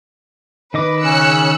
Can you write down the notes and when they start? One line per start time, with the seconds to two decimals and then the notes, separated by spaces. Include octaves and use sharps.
0.74 D#3 B4 D#5 D6
1.03 C#3 C#4 E6 F#6 C#7